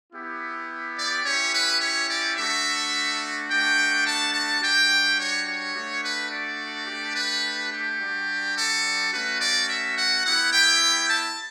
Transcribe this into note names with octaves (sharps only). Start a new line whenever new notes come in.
B3 E4 G4
D5
C#4 E4 G4 C#5
B4
C#5
D5
A3 D4 F#4 E5
A3 D4 F#4 G5
A5
A5
G3 D4 F#4 G5
C#5
C#5
A3 D4 F#4
B4
D5
A3 D4 G4
B4
G4
G3 D4 F#4
A4
A3 C#4 F#4 B4
D5
E5
F#5
B3 E4 G4 F#5
G5
A5